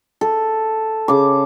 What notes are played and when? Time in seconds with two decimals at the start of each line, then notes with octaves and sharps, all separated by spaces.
0.21 A4
1.08 C#3 D6